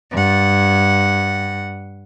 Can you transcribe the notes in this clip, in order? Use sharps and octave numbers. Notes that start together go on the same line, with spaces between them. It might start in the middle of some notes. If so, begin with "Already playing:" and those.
G2 F#5